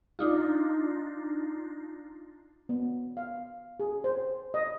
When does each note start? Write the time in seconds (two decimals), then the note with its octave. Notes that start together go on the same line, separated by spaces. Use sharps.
0.19 D4 D#4 F4
2.69 B3
3.17 F5
3.80 G#4
4.04 C5
4.54 D#5